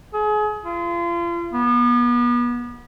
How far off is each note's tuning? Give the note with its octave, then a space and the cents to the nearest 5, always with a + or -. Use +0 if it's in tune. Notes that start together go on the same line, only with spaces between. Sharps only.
G#4 +30
F4 -35
B3 -35